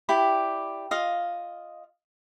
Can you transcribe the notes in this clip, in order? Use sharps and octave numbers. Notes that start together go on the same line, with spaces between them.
E4 G4 D5 B5
F4 D#5 F5